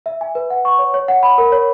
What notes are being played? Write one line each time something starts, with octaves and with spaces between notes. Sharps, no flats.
E5
G#5
B4
F#5
C#6
C#5
C#5
F#5
B5
A#4
C#5